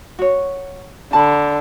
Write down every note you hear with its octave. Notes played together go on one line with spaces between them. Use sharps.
F#4 C#5
D3 A5 B5